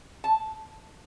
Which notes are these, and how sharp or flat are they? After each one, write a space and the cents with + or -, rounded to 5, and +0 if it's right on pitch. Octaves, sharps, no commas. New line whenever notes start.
A5 -10